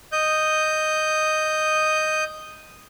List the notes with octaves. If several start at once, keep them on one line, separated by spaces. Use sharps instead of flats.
D#5 G6